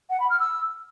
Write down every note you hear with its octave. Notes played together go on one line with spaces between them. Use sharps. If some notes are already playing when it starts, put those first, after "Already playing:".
F#5
B5
F6
E6